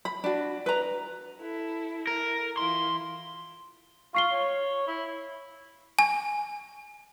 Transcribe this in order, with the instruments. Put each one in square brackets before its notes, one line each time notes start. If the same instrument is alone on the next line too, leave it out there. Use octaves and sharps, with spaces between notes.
[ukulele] B5
D4 F#4
B4 A#5
[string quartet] E4 A4
[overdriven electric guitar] A#4
[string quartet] E3 E4 F4 [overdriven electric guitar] C6
[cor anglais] F4 [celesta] C#6 C7 G7
[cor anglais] C#5
E4
[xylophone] G#5